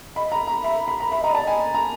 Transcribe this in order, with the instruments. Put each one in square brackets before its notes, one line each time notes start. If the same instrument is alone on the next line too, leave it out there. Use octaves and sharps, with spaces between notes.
[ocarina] D#5 [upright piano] B5
[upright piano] A#5
A#5
[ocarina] E5 [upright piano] B5
[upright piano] B5
A#5
[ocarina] E5 [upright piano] B5
[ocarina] D#5 [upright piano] A#5
[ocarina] D5 [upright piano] A5
[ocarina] D#5 [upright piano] G#5
[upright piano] A#5